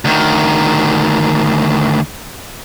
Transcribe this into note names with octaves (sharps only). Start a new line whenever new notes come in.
D2 D#3